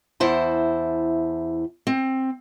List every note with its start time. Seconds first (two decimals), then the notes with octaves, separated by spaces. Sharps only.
0.20 E2 E4 C5 A5
1.87 C4